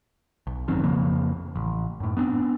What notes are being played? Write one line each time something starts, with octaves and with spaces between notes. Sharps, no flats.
B1
G#1 F#2 D#3 C4
F2 C#3 F3 A#3
A1
F#2 A2
B3 C4 D4